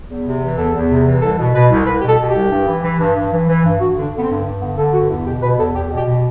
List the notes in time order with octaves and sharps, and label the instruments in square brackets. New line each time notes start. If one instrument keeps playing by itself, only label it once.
[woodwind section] E2
C3
E3
E2 A4
E2
C3
E3
C2 A4
B2
B2 B4
C2
C2 B4
B2 G4
A4
B2
G4
C2
G2
E3
E3
G2
G2
E3
E3
G2
G2 F#4
D3
D4
D3
B3
C4
G2
G2
D3 B3
D3 A4
G2 F#4
E2 E4
B2 G4
B2 B4
E2 A4
E2 G4
B2 G4
B2